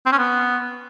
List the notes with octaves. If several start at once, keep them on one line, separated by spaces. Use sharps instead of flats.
C4
C#4
B3